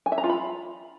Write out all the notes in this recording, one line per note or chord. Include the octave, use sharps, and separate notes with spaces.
G#5
E5
A#5
F4
B5